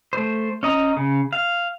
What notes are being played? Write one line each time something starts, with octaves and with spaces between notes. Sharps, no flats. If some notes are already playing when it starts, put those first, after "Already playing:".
A3 C5
C#4 D#5 A#5
C#3
F5